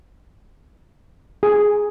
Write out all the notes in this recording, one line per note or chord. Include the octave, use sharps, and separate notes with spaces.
G#4